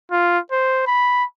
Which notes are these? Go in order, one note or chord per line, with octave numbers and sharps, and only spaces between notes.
F4
C5
B5